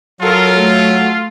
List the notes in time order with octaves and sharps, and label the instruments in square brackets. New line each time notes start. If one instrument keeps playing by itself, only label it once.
[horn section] F#3 [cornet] F4 [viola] A4 A#4
[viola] A3